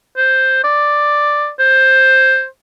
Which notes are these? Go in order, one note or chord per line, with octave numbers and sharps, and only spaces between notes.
C5
D5
C5